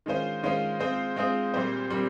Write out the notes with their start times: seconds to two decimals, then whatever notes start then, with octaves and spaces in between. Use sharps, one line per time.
0.06 D#3 G#3 C#4 F4 C5
0.43 D#3 G#3 C#4 F4 C5
0.80 G#3 C4 F4 G#4 C5
1.16 G#3 C4 F4 G#4 C5
1.54 A#2 G3 C4 G4 C5
1.90 A#2 G3 C4 G4